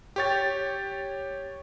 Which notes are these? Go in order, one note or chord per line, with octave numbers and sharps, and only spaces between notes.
G4 C#5 A6